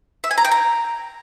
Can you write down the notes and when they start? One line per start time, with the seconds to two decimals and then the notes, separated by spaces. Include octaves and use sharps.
0.24 E5
0.31 G#5
0.38 A#5
0.45 G5
0.51 A#5